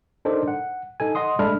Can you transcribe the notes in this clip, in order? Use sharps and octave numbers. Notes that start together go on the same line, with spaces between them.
D4 D#4 A4 A#4 C5 D5
F#5
D#4 A4 G#5
D#5 F#5 C6 D#6
G#3 A3 D4 A4 B5 F6